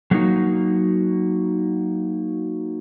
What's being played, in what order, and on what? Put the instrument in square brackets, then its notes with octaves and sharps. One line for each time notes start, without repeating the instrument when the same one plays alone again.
[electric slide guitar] F#3 A3 A#3 C#4 D#4 F#4